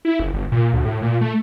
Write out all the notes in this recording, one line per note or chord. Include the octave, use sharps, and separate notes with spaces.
E4
F#1
G1
A#2
D2
A2
A#2
A3